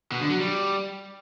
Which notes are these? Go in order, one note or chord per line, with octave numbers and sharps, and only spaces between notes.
B2
D3
F#3
G3